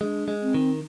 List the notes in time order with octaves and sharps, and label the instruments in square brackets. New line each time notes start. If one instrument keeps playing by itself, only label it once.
[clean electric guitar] G#3 [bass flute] D4
[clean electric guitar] G#3
[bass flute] C4
[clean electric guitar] D#3